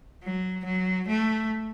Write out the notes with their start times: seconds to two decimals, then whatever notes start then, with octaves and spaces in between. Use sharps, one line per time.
0.23 F#3
0.65 F#3
1.08 A3